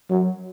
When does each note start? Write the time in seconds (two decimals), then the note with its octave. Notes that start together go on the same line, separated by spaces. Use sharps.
0.10 F#3